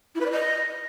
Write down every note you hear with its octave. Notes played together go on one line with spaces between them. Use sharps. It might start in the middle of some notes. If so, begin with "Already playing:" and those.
E4
B4
D5
D#5